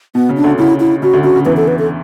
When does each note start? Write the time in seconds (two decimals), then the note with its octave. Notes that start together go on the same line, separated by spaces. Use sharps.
0.15 B2 B3
0.29 C#3
0.37 D4
0.44 D2 D3
0.58 C#3 E4
0.80 E4
1.02 C#3 F#4
1.13 D2 D3
1.24 C#3 F#4
1.36 C#3
1.45 E2 E3 B4
1.57 A4
1.68 B4
1.79 A4